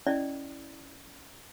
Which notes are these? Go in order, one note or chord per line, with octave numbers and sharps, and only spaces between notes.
C#4 E4 D5 D#5